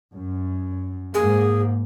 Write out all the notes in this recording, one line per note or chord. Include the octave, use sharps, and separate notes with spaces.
F#2
G#2 A#3 G#4